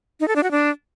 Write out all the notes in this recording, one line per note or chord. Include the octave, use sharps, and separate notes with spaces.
D#4
A4
D4
F#4
D4